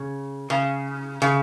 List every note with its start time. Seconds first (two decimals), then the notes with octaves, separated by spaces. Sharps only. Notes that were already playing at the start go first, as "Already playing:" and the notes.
Already playing: C#3
0.50 C#3
1.22 C#3